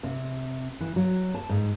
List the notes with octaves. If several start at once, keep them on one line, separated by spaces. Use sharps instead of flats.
C3
E3
F#3
A5
G#2